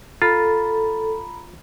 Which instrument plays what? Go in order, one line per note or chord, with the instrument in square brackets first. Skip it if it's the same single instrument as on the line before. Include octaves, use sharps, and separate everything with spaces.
[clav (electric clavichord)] F4 [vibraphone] A4 [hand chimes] A#5 B5